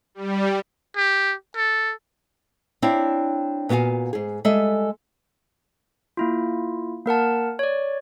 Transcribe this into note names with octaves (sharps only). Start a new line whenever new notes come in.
G3
G4
A4
C4 D4 E4 C#5 D5 F5
A#2 B3 F#4 F5 G#5
G#2 G#4
G3 G#3 A4 E5 G#5
A#3 E4 F4
A#3 A#4 F#5 A5
C#5 D5